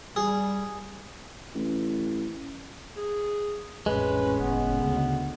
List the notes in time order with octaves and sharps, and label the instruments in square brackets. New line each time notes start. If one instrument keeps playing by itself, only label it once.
[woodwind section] G3 [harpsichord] G#4
[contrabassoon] A1
[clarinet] G#4
[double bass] A1 C#4 [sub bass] F2 [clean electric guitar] G#3 [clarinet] B4
[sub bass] F#1 [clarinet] B3
[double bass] D2 [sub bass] C#3